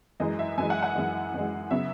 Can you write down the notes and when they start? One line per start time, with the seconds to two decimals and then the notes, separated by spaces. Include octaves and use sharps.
0.20 F#2 E3 G#3 D#5
0.39 E5
0.58 F#2 E3 G#3 G#5
0.70 F#5
0.83 F#5
0.95 F#2 E3 G#3
1.34 F#2 E3 G#3
1.71 C#3 F#3 B3 E5